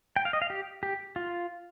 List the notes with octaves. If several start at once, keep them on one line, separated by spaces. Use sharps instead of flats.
G5
F5
D#5
F5
G4
G4
F4